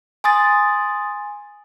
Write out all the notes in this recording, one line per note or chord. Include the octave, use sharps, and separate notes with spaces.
G#5 C6 D#6 A6